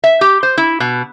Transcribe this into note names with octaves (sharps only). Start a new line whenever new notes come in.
E5
G4
C5
E4
B2